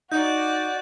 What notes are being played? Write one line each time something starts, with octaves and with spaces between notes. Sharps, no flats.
D#4 F#4 D5 D#5 G6